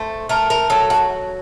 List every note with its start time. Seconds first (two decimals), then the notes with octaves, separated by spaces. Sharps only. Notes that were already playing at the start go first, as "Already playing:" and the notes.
Already playing: A3 C5
0.29 A3 A#4
0.50 A#4
0.70 F#3 A4
0.90 F#4